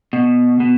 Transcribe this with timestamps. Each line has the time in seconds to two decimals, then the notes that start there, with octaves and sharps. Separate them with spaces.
0.13 B2
0.60 B2